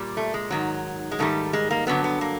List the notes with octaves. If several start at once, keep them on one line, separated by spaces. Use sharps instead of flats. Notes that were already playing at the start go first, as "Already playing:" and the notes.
Already playing: A#2 G3
A3
G#3
G#2 D#3 F#3
G#3
G#2 D#3 G3 A3
G#3
A#3
G2 D3 F#3 B3
B3
A#3